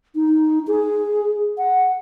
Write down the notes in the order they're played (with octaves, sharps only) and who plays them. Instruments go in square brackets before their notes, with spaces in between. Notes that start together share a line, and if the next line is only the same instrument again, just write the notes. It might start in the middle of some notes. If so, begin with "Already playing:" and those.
[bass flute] D#4
G#4
F#5